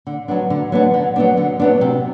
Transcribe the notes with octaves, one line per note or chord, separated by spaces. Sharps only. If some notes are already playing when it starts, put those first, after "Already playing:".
D3
F#3 B3 D4
D3
F#3 B3 D4
D3
F#3 B3 D4
D3
F#3 B3 D4
C3